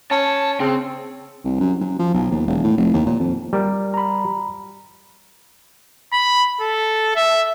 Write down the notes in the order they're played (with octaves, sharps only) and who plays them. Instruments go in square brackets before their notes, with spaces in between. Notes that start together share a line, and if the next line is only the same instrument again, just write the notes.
[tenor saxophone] C#4 [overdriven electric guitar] A5
[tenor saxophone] C#3 [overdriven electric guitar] C4
[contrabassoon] C2
F#2
F#2
F3
B1
D#2
E1
A2
F1
D#2
A#2
F2
[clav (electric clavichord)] G3 A#4
[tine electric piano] A#5 B5
[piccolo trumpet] B5
A4
E5